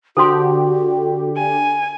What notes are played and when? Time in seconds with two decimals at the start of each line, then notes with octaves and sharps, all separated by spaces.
0.17 D3 F#4 G4 A4 C5 C6
1.38 G#5